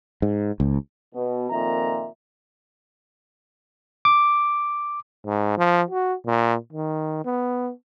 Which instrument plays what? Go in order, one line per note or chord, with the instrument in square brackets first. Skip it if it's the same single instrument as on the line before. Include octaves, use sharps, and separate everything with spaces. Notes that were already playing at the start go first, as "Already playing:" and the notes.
[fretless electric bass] G#2
C#2
[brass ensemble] B2
F2 A#2 D#3 E5 A#5
[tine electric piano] D6
[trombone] G#2
F3
F#4
A#2
D#3
B3